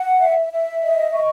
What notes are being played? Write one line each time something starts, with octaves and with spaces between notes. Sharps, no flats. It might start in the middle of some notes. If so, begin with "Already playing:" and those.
Already playing: F#5
E5
E5
D#5
C#6